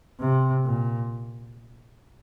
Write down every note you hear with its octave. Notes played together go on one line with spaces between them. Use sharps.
C3
A#2